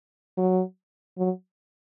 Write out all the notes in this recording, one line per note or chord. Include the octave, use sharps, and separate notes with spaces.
F#3
F#3